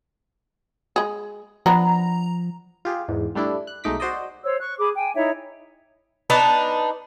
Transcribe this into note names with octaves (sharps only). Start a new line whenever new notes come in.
G#3 G#4
F3 B3 D4 A#5
F4 G4 G#4
E2 G#2
G3 A3 D4 E4
F#6
B1 G#3 A3 D#4 D6 B6
F#4 C5 D5 D#5
C5 C#5 E6
C#6 F#6
G#4 B5 D6
G5 G#5
D#4 E4 C#5 E5
B3 D4 D#4 A5